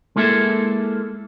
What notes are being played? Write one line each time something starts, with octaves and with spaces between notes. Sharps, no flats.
G#3 A#3 E4 A4 E5